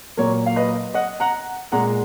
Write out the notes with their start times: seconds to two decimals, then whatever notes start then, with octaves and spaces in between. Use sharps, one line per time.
0.17 A#2 F#3 A#3 A#4 C#5
0.46 F5
0.56 B4 D#5
0.94 D#5 F#5
1.20 F#5 A#5
1.72 A#2 G#3 F#5 A#5